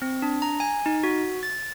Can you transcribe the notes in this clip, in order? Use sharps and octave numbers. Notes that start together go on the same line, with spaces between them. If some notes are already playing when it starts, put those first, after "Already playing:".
C4
D4
A#5
G#5
D#4
F#4
A6